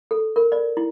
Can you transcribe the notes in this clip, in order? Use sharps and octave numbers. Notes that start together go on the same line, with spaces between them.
A4
A#4
D5
E4